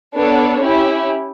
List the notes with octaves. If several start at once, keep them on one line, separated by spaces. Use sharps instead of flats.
B3 D4 A4 C#5
C#4 E4 G4